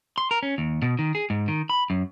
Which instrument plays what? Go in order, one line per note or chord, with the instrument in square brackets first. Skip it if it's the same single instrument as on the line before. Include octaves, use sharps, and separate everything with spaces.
[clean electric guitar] C6
A#4
C#4
D#2
B2
D#3
G#4
G#2
D#3
B5
F#2